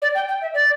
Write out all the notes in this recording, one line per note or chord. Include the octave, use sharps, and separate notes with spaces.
D5
G5
G5
E5
D5